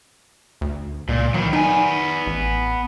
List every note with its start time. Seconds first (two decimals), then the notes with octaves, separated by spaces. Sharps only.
0.61 D2
1.09 C#2 A#2
1.34 D#3 E3 F#3
1.53 B3 D#4 G#5
2.27 A1